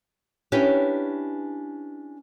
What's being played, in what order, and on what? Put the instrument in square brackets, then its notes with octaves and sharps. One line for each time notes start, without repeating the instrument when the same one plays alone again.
[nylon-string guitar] C#4 D4 E4 G4 B4 C#5